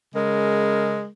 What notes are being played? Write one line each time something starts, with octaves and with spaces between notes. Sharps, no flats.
C#3 G#3 A#4